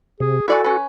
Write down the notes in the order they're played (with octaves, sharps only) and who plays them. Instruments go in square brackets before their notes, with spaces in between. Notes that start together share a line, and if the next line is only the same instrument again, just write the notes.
[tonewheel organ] C3 [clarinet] G#4
[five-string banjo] E4 D5 G#5 [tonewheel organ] F#4 [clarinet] A4
[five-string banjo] C#4 B4